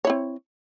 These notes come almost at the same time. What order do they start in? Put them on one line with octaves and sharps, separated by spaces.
C#5 E4 C4